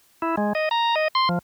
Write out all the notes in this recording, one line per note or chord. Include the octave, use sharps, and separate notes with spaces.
E4
G#3
D#5
A#5
D#5
C6
F3